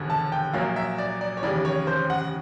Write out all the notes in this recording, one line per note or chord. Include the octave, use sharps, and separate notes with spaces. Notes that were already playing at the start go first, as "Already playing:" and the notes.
Already playing: E1 D#2 D3
A5
G5
A#1 A#2 F#3 A#3 F5
E5
D5
D5
C#5
F1 D#2 C#3 E3 D5
C#5
C5
F#5